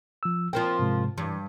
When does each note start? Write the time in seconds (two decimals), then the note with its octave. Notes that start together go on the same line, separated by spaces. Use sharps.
0.23 F3 E6
0.53 F3 A#3 C4 G5
0.79 G#2 C3 G#3
1.18 G2 E3